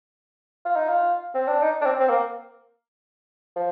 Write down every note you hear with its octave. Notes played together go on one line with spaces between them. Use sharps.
F4
D#4
F4
C4
D4
D#4
D4
C4
C4
A#3
F3